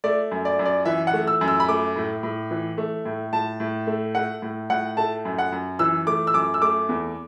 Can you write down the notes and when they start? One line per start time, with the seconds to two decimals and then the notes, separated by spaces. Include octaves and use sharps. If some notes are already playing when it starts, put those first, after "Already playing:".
0.04 A3 D5
0.31 F#2
0.45 D5
0.59 F#2
0.65 D5
0.85 E3 E5
1.07 F#5
1.13 A3
1.27 E6
1.41 F#2
1.48 E6
1.60 B5
1.68 A3 D6
1.96 A2
2.23 A2
2.51 E3
2.78 A3
3.05 A2
3.33 A2 A5
3.60 A2
3.87 A3
4.15 A3 F#5
4.42 A2
4.70 A2 F#5
4.97 A3 A5
5.25 F#2
5.38 F#5
5.52 F#2
5.79 E3 E6
6.07 A3 D6
6.27 E6
6.34 F#2 D6
6.54 E6
6.62 A3 D6
6.89 E2